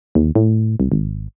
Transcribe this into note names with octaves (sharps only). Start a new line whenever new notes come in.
D#2
A2
C2
G#1